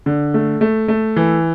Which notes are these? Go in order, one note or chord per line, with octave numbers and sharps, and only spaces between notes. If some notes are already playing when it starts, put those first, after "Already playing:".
D3
A3
A3
A3
E3